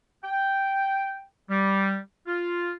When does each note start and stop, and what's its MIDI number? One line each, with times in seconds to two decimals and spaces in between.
0.24 1.23 79
1.50 1.97 55
2.27 2.72 65